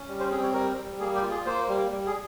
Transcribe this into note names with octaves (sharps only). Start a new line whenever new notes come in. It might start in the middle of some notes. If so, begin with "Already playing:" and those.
Already playing: C#4
G3
C5
C4 G#4
C#5
G3 A#4
G3
A#3 G#4
G4
F4
G#4
A#3 C5
G3
G3
G#4